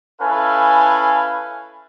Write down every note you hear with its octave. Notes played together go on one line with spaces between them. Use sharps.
C#4 E4 A4 B4 F5 G#5